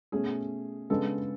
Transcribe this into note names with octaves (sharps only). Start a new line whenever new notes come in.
B2 A3 C#4 G#4
C#3 G#3 B3 D4 A4